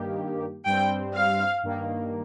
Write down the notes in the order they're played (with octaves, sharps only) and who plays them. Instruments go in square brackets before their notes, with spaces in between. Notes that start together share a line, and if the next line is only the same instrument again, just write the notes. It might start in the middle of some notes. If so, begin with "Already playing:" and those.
Already playing: [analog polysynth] G2 D#3 A#3 G4
[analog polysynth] G2 G3 C4 [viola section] G5
[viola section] F5
[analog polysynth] G2 D#3 A#3